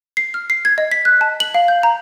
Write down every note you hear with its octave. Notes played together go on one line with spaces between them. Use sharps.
C7
F6
C7
G#6
D#5
B6
F#6
A5
F#7
F5
G6
A#5